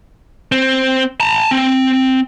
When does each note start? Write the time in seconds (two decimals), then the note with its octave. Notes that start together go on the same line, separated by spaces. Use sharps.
0.52 C4
1.20 A5 A#5
1.51 C4